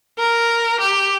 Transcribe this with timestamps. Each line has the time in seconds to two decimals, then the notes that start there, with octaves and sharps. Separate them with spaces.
0.18 A#4
0.80 G4